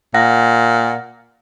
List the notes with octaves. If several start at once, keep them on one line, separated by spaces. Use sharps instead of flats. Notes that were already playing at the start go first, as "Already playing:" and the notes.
A#2 F#5 A#6